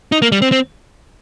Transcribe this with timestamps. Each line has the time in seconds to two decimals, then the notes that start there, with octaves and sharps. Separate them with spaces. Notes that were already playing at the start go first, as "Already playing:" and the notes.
0.12 D#4
0.22 A#3
0.32 G3
0.42 C4
0.52 C4